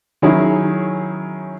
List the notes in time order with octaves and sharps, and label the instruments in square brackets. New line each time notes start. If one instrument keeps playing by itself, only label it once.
[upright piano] D#3 F#3 C#4 E4 G#4